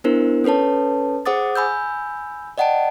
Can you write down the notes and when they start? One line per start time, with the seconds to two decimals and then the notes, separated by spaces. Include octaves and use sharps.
0.04 B3 D4 E4 A#4 C5
0.44 C#4 A4 B4 C#5 A5
1.26 G#4 C5 F#5 D6 D#6 A6
1.55 G#5 B5 E6 G6
2.58 D5 D#5 F#5 G5 A5 D7